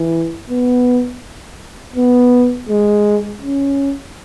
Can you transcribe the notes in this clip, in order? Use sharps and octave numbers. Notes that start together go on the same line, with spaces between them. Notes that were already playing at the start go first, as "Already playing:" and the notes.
Already playing: E3
B3
B3
G#3
C#4